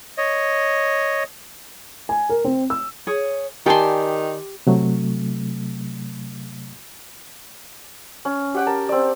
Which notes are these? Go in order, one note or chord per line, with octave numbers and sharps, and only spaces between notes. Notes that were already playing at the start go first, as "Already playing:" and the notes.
C#5 D#5
G#5
A#4
C4
E6
G#4 C#5
D#3 G4 D5 G#5 A5 C6
C3 F#3 A3
C#4
G4 F#5 G5
A#4 A5
C4 D5